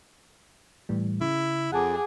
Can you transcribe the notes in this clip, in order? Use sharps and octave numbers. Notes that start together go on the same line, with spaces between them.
A2 E3 G3
C#3 E4
F2 G#4 F#5 A5 D6